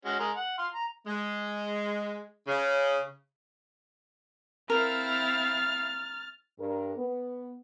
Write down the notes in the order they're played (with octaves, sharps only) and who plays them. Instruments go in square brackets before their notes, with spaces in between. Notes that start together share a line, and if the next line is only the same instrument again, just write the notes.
[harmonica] G#3 C#4 F#4
G#3 G#4 A#4
F#5
F5 C6
A#5
[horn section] G#3
C#3
[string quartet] C4 E4 F5 [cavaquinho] A#4 [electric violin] F6 A6
[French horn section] G2 A#4
B3